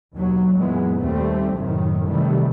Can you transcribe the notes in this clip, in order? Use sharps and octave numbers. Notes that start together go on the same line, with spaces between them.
D#2 B2 F#3
F#2 A#2 E3 G#3 B3
D#2 G3 A3 C4
F#1 F#2 A2 C3 D#3
C3 D#3 E3 G3 A3